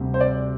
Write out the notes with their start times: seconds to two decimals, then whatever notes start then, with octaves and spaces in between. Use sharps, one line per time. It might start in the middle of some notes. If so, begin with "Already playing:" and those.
Already playing: D2 C3 G3
0.14 C5
0.21 D5